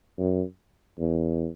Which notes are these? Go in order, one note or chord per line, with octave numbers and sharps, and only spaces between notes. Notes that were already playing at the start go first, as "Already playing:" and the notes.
F#2
E2